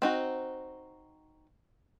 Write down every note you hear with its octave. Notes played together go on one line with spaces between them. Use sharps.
C4 D#4 F#4